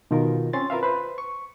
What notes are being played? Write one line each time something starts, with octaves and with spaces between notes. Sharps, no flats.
B2 D#3 D#4 F4 A#4
C4 C#4 C6 A6
F4 A#4 B4 E5 F5
B4 C5
C#6